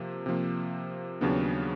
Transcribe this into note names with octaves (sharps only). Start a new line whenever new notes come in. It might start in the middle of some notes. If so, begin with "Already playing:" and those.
Already playing: C3 F3 A#3
C3 F3 A#3
D#2 C#3 F#3 B3 D4